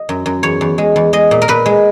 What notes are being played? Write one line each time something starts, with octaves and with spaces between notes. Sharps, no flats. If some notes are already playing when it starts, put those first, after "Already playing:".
Already playing: D#5
F#2
F#2
E2 C#5
E2
G#3
E2
G#3 D#5
A#2
A#4
A#2 B4
G#3